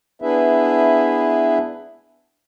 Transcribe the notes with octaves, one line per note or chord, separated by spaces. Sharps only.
B3 D4 E4 G#4 B4 E5